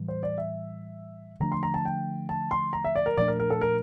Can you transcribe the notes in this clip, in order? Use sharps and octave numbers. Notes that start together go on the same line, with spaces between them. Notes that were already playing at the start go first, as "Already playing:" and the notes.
Already playing: A2 E3 G3
C5
D5
E5
D3 F3 A3 D4 A#5
C6
A#5
A5
G5
A5
C6
A#5
E5
D5
A#4
A#2 F3 A3 D4 D5
A#4
A#4
A4
A#4